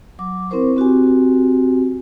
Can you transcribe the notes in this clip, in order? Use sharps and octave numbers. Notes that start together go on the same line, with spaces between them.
F#3 D6
C4 E4 A#4 C5 C#6
C4 F#4 G4 G#5